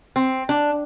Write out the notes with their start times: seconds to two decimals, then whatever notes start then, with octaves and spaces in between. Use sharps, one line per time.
0.16 C4
0.49 D4